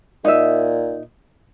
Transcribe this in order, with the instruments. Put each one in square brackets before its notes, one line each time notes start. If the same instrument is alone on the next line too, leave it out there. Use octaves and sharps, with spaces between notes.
[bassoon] A#2 [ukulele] D#4 E5